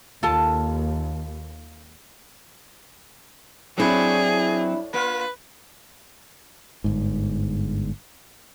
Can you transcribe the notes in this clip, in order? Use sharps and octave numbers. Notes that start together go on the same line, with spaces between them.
D#2 F4 A4 A5
A2 F#3 C4 D4 E4 G#4 D5
A#3 F4 B4
G1 G#2